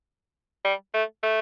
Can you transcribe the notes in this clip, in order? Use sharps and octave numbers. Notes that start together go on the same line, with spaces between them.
G3
A3
A3